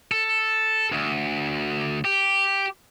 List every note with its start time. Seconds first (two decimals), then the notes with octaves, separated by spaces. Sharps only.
0.12 A4
0.92 D2
2.05 G4